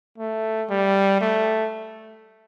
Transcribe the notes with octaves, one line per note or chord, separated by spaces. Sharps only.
A3
G3
A3